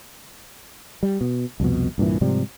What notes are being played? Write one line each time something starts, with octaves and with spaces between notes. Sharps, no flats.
G3
B2
C2 F2 B2
C2 G2 A#2 E3
G#2 C3 F3 G3